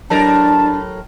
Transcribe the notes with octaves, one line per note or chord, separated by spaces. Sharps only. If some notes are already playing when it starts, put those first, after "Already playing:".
A2 F#3 D4 A#4 A5